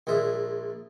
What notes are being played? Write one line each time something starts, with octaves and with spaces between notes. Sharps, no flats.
A#1 A#2 G#3 E5